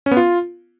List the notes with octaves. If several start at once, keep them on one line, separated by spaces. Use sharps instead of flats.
C#4
B3
F4